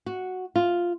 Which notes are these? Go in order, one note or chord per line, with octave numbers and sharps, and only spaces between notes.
F#4
F4